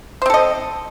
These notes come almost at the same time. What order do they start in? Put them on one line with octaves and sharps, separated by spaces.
C5 C4 A4 D#5